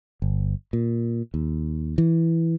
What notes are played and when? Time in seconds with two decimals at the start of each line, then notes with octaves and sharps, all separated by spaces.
0.22 G1
0.73 A#2
1.34 D#2
1.98 E3